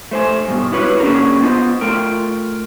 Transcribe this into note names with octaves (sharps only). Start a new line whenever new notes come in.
A3 C5 G#5
G2 B2
E4 F#4 B4 C#5
A#3 C#4 D4 G#4 A#4
B3 F4 C5 D#5
A3 F4 A#4 G5